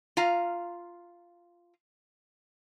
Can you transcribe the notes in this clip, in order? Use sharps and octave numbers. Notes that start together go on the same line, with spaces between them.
F4 F5 A#5